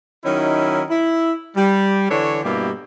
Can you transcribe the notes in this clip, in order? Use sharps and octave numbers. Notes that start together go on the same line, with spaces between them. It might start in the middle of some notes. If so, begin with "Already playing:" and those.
D#3 F#3 C#4 D#4 E4
E4
G3
D3 E3 D4 A4 C#5
G2 B2 G3 A#3 E4 G4